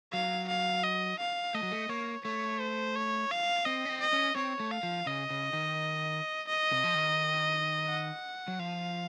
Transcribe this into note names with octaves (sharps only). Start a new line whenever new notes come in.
F#3 F5
F5
D#5
F5
A3 D#5
F#3
A3
A#3 C#5
A3 C#5
C5
C#5
F5
C4 D#5
C#4
C4
D#5
C#4
C4 C#5
A3
F5
F3
C#3 D#5
C#3
D#3
D#5
C3
F3
D#3
F#5
F#3
F3 F5